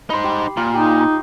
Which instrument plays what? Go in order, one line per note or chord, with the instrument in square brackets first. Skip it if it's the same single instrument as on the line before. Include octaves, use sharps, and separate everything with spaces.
[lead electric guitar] D#4 C5 [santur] B5 C6
[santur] G4
[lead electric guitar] A#2 [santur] F4
[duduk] D#4 [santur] G4